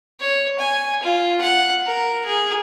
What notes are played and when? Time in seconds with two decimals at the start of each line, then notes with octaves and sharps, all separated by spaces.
0.21 C#5
0.59 G#5
1.04 F4
1.41 F#5
1.87 A#4
2.26 G#4